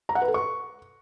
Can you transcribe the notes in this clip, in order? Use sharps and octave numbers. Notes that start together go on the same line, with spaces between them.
A#5
F#5
B4
A4
C#6